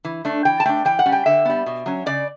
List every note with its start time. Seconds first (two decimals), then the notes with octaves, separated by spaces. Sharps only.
0.05 E3
0.25 A3 D4
0.45 E3 G5
0.60 A5
0.65 A3 D4 G5
0.85 E3 G5
0.99 F#5
1.06 G3 C#4
1.12 G5
1.26 D3 E5
1.45 G3 B3
1.66 B2
1.86 F#3 C#4
2.06 C#3 D5